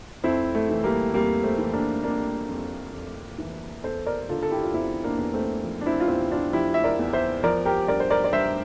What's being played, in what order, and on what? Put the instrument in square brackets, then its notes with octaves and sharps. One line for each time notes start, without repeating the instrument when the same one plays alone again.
[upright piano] F2 C4 E4
A3
E3
G3 A#3
F2 G3 A#3
A3 C4
E3
A#3 D4
F2 A#3 D4
F2
F2
E3
E2 A4 C5
A#4 D5
D3 F4 A4
A4
E4 G4
F4
E2 C4 E4
A#3 D4
E2
A3 C4
F3
D4
C4 E4
F4
E2 C4 E4
D4 F4
F3 E4 G4
E5
A#4 D5
E2
C5 E5
F3 A#4 D5
G4 A#4
G2 A#4 D5
C5
A#4 D5
D5
G2 C5 E5